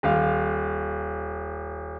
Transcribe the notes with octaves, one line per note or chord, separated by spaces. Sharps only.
D#1 F5